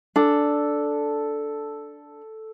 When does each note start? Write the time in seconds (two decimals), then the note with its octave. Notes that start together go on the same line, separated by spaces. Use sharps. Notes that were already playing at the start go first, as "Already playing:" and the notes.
0.16 D4 A4